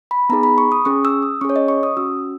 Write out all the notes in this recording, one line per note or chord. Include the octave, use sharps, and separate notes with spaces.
B5
B3 D#4 G#4 A#5
B5
C#6
D#6
C#4 G#4 C#6
E6
D#6
C#4 G#4 C#6
C#5
D#5
C#6
D#6
C#4 F#4 E6